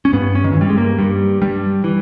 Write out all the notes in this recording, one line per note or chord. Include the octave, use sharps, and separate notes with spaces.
C#4
G2 B3
C#4
D#3
G2 E3
G3
G#3
A#3
G2 G3
G2 G3
E3